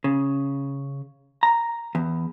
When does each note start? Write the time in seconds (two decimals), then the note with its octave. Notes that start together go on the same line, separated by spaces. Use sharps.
0.04 C#3
1.43 A#5
1.95 E2